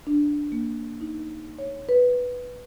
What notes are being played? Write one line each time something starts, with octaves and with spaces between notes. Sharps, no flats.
D4
A#3
D#4
C#5
B4